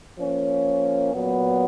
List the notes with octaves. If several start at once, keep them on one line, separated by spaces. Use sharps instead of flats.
F3 A#3 C#4
A#2 F#3 B3